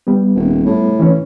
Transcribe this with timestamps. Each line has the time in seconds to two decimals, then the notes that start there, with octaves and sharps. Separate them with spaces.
0.07 G3 B3
0.35 D#1
0.66 A2
0.99 E3 C#4